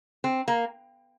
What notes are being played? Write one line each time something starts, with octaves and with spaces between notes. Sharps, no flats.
C4
A#3